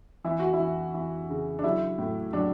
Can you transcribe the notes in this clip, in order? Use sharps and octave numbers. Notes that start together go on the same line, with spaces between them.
E3 E4
F#4
E4
E3
E3
C#3
D4
F#3 E4
A2
F#3 D4